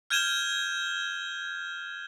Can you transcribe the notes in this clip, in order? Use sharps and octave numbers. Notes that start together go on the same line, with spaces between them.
F6 G6 G#6 D#7 E7 G7